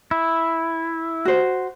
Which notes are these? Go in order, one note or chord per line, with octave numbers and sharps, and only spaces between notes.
E4
F#4 C5